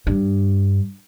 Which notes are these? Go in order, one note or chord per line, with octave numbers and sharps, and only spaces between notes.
G2